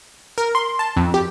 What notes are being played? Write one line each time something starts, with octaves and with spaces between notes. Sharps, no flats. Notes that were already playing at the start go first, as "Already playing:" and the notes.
A#4
C6
A5
F2
G4